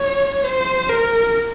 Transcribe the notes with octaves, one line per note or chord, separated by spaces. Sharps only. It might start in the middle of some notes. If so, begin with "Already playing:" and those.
Already playing: C#5
C5
A#4